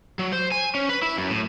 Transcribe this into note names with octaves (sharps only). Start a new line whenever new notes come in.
F#3
C5
G#5
C#4
B4
E4
F#2
A2